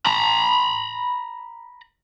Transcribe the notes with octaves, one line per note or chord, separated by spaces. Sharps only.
A#5 B5